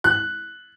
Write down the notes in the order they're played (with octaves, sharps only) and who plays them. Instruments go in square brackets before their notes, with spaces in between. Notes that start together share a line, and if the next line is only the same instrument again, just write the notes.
[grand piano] F#6